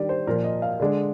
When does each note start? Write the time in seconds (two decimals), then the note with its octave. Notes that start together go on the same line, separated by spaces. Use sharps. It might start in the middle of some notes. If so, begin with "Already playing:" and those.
Already playing: D#3 G3 D4 D5
0.09 C5
0.27 A#2 F3 A#3 A#4
0.44 D#5
0.62 F5
0.80 D3 G#3 D4